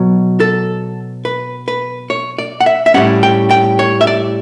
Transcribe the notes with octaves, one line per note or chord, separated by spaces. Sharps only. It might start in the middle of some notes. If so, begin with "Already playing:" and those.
Already playing: B2 F#3
A4
B4
B4
C#5
D5
F#5
E5
E5
A2 G3 C#4 F#5
G5
G5
C#5
E5
D5